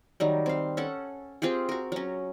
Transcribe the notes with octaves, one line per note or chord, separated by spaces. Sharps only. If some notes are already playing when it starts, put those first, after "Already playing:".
D#3 F#3 G3
C4 F5
C#4 A4 F#5
C4 F4 G4 G#4
F#4 A#4
F#3 C#4